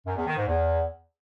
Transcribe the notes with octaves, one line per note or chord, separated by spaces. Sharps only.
F#2
E2
D#3
G#2
E2